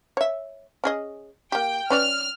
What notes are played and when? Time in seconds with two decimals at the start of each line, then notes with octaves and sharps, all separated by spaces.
0.17 C#5 E5
0.84 C#4 G#4 D#5
1.52 A#3 G4 G5
1.90 C#4 B4 D5 F6